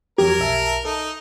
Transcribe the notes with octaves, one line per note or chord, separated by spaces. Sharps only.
F2 F#3 G4 A#4 G#6
B1 E5 A5
D#4 A4